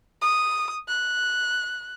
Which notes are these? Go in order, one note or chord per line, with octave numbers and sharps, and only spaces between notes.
D#6
F#6